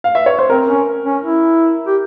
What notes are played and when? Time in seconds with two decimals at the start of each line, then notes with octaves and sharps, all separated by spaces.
0.04 F5
0.15 E5
0.26 C#5
0.39 C5
0.50 C4 A#4
0.68 C#4
1.05 C#4
1.23 E4
1.87 G4